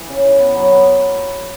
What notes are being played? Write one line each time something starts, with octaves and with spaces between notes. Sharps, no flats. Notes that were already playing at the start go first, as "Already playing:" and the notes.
Already playing: E3
C#3
E4
B3
F#3
B3